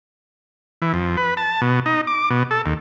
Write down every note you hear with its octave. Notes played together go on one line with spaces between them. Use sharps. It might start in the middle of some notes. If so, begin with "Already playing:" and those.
E3
F2
B4
A5
B2
D#4
D6
B2
A4
D#2